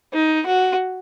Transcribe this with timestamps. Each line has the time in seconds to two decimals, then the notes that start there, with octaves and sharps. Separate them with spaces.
0.13 D#4
0.46 F#4